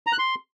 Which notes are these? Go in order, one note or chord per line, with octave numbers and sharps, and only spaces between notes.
A#5
F#6
C6